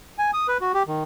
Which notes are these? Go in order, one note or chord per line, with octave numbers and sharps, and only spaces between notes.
G#5
D#6
B4
F#4
G4
D#3